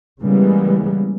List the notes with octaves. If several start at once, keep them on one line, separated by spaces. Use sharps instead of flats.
C#3 E3 G3 G#3 A#3 B3